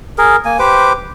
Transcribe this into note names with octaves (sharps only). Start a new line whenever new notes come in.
G#4 A#4
A#3 G#5
G4 B4 C5 D6